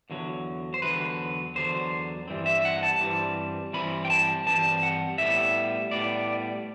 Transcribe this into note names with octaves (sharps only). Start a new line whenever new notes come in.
E2 D3 F#3
C5
E2 D3 F#3 B4
E2 D3 F#3 C5
G2 E3 G3 C4
E5
F#5
A5
G2 E3 G3 C4
G2 E3 G3 C4 B5
G5
A5
G2 E3 G3 C4 A5
F#5
A2 G3 B3 E5
A2 G3 B3 D5